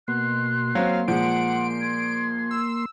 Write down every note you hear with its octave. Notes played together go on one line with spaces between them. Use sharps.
B2 A#3 C6 F#6
F#3 C4 F5
A#2 F3 G#3 F#5 D7
G#6
E6